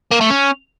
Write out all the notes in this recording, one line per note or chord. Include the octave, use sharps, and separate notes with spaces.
A#3
A3
C#4